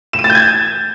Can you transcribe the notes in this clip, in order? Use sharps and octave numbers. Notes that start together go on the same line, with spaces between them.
E7
D#7
A6
G6
G#6